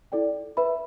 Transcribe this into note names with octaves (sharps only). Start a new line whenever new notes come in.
E4 A4 D5 G5
B4 E5 B5